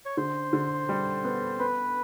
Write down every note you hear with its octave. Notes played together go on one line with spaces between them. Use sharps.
C#5
D3 C5
D3
G3
B3
B3 B4